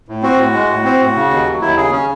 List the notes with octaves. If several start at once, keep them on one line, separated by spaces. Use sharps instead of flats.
A2
C4 F#4
A2
G#3
A2
C4
A2
C#3
D#2
F#3
D#2 E4
C#3 G#4
C#4